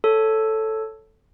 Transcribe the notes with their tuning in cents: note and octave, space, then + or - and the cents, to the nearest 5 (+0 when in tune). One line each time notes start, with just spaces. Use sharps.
A4 +0 C#5 +0